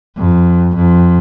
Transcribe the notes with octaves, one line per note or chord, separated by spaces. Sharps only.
F2
F2